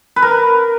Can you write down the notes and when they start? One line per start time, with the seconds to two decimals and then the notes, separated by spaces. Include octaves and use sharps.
0.16 B4
0.22 A#4